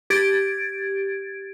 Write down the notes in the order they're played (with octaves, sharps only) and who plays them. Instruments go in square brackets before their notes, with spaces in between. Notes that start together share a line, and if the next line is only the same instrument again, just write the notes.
[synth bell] G4 G#6 A6 D7